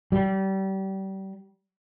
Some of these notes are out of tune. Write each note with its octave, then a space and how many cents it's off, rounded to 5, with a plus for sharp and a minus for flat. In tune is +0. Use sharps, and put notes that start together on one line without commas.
G3 -30